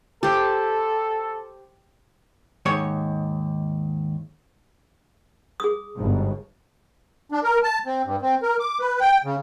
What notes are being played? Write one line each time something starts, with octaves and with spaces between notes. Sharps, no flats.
G4 A4 C5
D#2 G#2 C#5
G#4 D#6
G1 G#2 B2
D4
A#4
A5
C4
G2
C4
A#4
D6
B4
G5
C#3